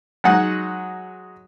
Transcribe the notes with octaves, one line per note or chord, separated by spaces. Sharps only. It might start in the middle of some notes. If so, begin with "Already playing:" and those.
F#3 G#3 D#4 F#5